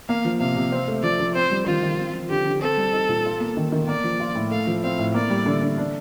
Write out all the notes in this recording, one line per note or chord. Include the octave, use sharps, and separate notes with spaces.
A#3 F5
F3
C3 F5
C3
C4
A3
F3 D5
F3
C4 C5
G3
D#3 F4
D#3
C4
F3
D3 G4
D3
C4 A4
G3
D#4
A#2
F4
A#3
D#3
D#3
A#3 D5
F3
F4
A2
A3 F5
F3
C4 F5
A2
A#3 D5
G3
D3
D3
D4